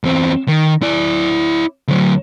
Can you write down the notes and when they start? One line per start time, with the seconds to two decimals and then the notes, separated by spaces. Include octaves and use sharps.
0.04 E2 C4
0.48 D#3
0.82 E4 D5
1.88 D2 F#3